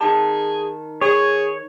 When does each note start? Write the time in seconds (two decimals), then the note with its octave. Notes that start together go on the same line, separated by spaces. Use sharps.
0.01 D#3 G#4 A5
1.01 G#4 C#5